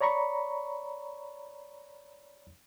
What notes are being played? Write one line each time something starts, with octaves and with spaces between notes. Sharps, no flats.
C#5 D5 A#5 B5 C#6